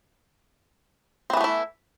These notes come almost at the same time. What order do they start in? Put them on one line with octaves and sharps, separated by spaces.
C4 E3 B3 A3 E4